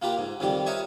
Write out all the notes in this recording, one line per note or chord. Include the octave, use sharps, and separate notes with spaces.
A#3 F4 G4 A#4 B4
G#2
F2 D#3 G3 G4
A#4 B4 C#5 D#5 E5 G#5